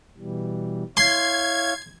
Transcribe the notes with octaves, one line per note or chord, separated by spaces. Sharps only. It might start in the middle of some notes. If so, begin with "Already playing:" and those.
B2 E3 G3
E4 C#5 F5 C6 G#6